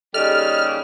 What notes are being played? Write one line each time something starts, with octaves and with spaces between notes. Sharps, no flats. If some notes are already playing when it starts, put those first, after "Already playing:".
D#2 C#3 G3 A4 D#5 F6